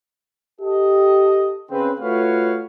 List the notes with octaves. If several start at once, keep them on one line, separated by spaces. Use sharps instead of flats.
G4 A4 D#5
C#3 C4 B4
A3 F4 F#4 B4 C#5 F5